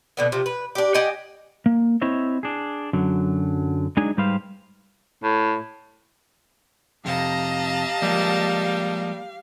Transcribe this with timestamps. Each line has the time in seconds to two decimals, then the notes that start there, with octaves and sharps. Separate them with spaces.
0.17 B2 D3 B3
0.32 C3 F3
0.46 B4
0.75 D4 G4
0.94 G4 D#5 F#5 G#5
1.66 A#3
2.01 C4 E4 C5 C#5 D#5 E5
2.43 D4 G#4
2.93 F#2 D3 F#3
3.97 F#3 G#3 D4 D#4 G#4 G#5
4.17 G#2 G3 G4 B4 C5 F5
5.23 A2
7.05 F2 C3 G4 D#5 F5 A5 A#5
8.02 F3 G3 G#3 A#3